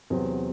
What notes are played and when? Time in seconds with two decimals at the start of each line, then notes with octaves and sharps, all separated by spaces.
0.10 E2 C3 F#3 C4